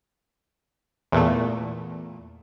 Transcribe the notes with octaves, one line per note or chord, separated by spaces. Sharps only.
E2 A#2 A3